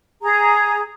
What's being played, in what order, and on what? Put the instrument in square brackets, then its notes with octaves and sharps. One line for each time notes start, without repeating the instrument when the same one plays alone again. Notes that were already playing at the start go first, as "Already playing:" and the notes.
[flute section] G#4 A#5